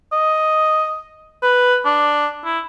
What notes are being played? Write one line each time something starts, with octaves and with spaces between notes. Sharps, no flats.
D#5
B4
D4
E4